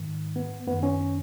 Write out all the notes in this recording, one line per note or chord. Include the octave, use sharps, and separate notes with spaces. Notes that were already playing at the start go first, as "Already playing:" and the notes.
Already playing: G#2 D#3
B3
F#2 D#3 B3
C#4